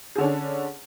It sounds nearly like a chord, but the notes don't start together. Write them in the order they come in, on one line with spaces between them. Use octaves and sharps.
G#4 D3 C#4 D4